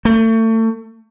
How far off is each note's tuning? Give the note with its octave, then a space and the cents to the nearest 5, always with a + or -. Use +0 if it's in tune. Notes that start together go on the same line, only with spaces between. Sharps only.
A3 +30